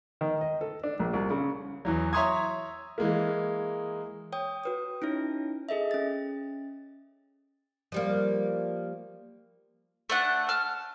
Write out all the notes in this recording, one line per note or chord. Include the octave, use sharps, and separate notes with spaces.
D#3
D#5
A4
D4
A#1
C2
C#3
E2 E3 F#3
C#5 E5 A#5 C6 D#6 G#6
E3 G#3 A#3
C#5 G5 D#6
F#4 B4 D#6
C#4 D#4 E4 C#5
G#4 A4 D#5 E5
C#4 A6
F3 G3 A#3
A3 D4 F#5
A5 F6